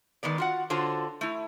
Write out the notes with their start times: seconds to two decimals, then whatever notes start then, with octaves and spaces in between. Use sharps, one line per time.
0.23 D#3 G#3 B3 D5
0.38 F4 F#4 F#5
0.70 D3 F4 F#4 C5 C#5 A5
1.21 A3 E4